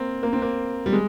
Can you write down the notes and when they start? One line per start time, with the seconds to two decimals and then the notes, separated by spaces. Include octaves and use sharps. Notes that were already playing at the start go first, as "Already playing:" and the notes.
Already playing: A#3 C4
0.23 A#3
0.33 C4
0.42 A#3
0.86 G3
0.93 G#3